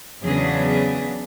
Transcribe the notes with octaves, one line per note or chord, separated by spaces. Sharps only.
E2 C#3 F#3 B3 D4 G#4
G#4